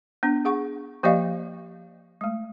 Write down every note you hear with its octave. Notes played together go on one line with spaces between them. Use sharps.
B3 D4
G#4 F#5 C#6
F3 A#3 G4 D5 D#5 F5
G#3 A3